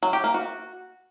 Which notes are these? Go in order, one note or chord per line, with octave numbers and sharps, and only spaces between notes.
F#3
G4
A#3
F#4